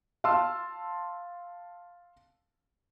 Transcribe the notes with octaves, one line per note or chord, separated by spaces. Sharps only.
F5 A5 C6 E6